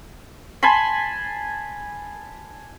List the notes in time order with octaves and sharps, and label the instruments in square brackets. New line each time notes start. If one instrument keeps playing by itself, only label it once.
[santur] G#5 A5 B5 C6